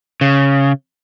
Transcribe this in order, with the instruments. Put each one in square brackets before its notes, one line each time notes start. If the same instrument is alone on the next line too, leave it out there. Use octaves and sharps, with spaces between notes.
[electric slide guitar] C#3